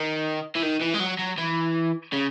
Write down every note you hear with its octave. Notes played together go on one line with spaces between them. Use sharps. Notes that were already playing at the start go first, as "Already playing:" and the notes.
Already playing: D#3
E3
D#3
E3
G#3
F#3
F#3
E3
C#3